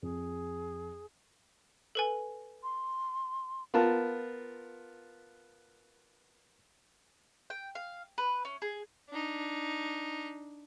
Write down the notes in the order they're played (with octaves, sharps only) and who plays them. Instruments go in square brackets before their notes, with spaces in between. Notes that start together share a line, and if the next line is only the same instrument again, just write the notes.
[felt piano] F2 [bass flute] G#4
[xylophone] A4 B4 G#5
[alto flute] C6
[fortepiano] B3 F4 A#4 A5
[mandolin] G5
F5
B4
C#4
G#4
[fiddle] D4 D#4